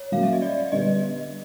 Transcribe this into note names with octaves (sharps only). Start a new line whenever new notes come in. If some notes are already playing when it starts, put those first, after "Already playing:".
Already playing: C#5
F#3 A#3 C#4 F5
E5
D#5
D5
D3 G3 B3 D#5